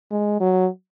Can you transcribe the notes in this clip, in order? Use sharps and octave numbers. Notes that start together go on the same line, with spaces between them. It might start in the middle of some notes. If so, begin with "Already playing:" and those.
G#3
F#3